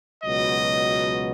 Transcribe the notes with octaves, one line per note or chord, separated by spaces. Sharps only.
C#2 B2 F#3 D#5